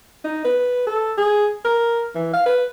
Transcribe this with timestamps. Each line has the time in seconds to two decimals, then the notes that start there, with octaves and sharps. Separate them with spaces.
0.24 D#4
0.44 B4
0.87 A4
1.17 G#4
1.65 A#4
2.15 E3
2.33 F5
2.46 B4